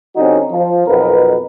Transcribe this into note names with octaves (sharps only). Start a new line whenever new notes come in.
D3 G3 C4 C#4 D#4 F#4
F3
B1 F2 B2 B3 A#4 B4